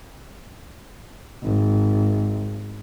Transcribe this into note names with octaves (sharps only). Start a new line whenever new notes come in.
G#1